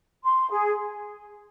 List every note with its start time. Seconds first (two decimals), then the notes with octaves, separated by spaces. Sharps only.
0.25 C6
0.49 G#4